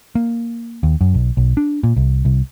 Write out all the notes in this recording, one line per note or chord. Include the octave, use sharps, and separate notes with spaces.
A#3
D#2
F#2
B1
B1
D4
A#2
C2
C2